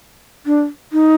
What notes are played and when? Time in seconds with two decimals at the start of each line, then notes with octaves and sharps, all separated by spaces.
0.46 D4
0.92 D#4